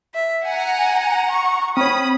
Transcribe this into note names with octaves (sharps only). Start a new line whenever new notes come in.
E5
F#5 G#5 A#5
C#6
C4 C#5 B5 D#6